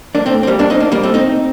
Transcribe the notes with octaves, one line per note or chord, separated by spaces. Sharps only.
A#3 D4
A3 C4
C4
G3 A#3
A#3 D4
C4 D#4
A#3 D4
G3 A#3
A3 C4
C4 D#4